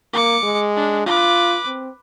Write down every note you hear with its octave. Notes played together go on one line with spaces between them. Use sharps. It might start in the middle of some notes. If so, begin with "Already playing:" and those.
A#3 D6 C#7
G#3
D4
F4 B4 D6
C4